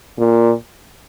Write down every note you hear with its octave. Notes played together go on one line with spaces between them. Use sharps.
A#2